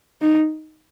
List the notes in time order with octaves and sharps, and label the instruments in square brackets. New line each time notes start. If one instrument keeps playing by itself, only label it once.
[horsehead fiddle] D#4